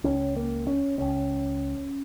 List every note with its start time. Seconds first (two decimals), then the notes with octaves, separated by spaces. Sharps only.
0.04 C#2 C#3 C#4
0.36 A#3
0.67 C#4
0.98 C#2 C#3 C#4